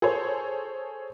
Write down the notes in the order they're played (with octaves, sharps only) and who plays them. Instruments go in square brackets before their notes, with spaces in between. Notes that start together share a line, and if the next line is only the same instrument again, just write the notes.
[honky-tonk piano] G#4 A4 C5 C#5